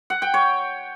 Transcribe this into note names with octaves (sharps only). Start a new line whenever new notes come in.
F#5
G5
C#5